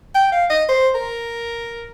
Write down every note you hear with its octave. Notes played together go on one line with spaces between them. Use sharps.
G5
F5
D#5
C5
A#4